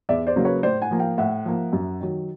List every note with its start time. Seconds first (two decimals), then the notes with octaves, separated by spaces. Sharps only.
0.09 E2 D5 E5
0.27 C5 D5
0.36 C#3 F#3 A#3
0.45 B4 C#5
0.63 A2 C5 D5
0.82 F#5 G#5
0.91 F3 A#3
1.00 F5 G5
1.18 A2 E5 F#5
1.45 F3 A#3
1.73 F#2
2.00 D#3 F#3